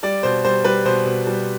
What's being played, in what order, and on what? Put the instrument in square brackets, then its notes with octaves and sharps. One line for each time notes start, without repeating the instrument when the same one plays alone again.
[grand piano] G3 D5
B2 C5
G3 C5
G3 B4
B2 C5
B2
G3